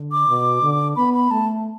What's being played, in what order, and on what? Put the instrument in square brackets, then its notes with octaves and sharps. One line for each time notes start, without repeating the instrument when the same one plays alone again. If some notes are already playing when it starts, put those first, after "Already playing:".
Already playing: [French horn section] D3
[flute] D6
[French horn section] B2
D3
[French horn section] B3 [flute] B5
[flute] B5
[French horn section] A3 [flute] A5